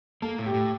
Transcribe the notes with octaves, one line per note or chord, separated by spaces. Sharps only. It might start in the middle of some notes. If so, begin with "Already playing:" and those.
A#3 A4
A2
G4
A2